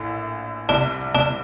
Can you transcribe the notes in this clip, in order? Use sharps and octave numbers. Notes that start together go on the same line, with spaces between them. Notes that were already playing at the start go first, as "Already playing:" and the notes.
Already playing: A#1 A2 A3
C2 C3 G3 D4
D4